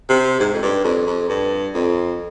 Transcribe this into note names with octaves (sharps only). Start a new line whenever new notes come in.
C3
G#2
F2
G2
F2
F2
G2
F2